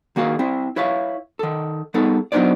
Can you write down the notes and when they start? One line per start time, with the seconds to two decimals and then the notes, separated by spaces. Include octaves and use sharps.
0.16 D#3 A#3 F#4 G#4 F5
0.39 C4 E4
0.76 E4 B4 C#5 E5 F5
1.39 D#3 A4
1.94 G3 B3 D#4 G#4 A4
2.32 F#3 B3 D4 D#4 C5 D5